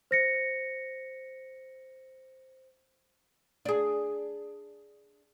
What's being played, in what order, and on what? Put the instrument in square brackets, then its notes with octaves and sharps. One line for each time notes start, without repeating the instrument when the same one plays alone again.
[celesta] C5 A#6 C#7
[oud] D4 G#4